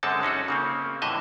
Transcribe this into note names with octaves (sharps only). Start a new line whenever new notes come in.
F#2 D3 G#3 C4 A4 A5
C#4 D#4 F#4 A4
C#3 A#3 C4
A2 D3 E3 D#5 E5